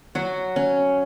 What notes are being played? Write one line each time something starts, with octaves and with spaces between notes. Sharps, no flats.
F#3 F#4
C#4